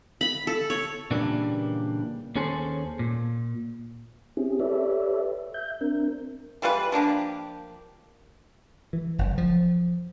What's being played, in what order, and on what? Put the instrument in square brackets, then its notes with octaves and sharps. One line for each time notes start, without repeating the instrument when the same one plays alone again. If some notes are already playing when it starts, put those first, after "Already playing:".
[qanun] B5
A4
C#5
[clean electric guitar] A#2 C#3 E3 G3 A#3 D4
D#2 C#4 G#4 A4 C5
A#2
[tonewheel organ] C4 C#4 E4 G4 G#4
G4 A4 B4 C#5 D5 E5
E5 G6
C4 D4 A#4
[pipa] E3 G3 F4 B4
F3 A#3 D4 G4
[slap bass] E3
F#1
F3